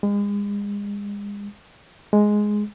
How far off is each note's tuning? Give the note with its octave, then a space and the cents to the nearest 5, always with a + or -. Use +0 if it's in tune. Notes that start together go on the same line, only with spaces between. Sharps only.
G#3 -35
G#3 +5